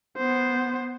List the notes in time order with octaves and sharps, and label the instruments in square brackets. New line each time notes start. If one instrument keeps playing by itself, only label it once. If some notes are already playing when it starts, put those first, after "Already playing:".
[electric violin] B3 C5